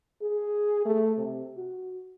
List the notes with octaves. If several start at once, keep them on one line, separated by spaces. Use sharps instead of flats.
G#4
A3
C3
F#4